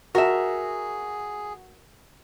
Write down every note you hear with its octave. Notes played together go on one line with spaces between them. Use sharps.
F#4 G#4 A#4 E5